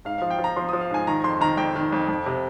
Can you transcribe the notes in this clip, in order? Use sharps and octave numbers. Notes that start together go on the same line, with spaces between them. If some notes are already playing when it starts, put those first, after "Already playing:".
G#2 F5
F3 F5
G5
F3
A#5
F3 C6
F3 D#6
F5
G#2 G#5
D#3 A#5
F2 C6
D#3 A#5
F2 G5
D#3
F2
F2
C3